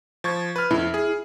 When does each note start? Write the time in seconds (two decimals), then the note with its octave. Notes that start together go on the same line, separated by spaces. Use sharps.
0.24 F3 C#6 G#6
0.56 B4 F6
0.71 F2 E4
0.94 G#4